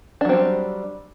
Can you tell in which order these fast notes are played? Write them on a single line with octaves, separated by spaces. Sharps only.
D4 F#3 C4 G3